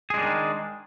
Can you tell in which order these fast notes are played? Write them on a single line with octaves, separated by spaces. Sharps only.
G#4 G#3 D4 D#3